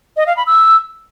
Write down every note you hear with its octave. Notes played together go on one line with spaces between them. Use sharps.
D#5
F5
B5
E6